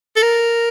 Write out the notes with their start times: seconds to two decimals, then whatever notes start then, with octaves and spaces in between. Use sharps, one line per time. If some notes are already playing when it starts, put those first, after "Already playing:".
0.16 A4
0.22 A#4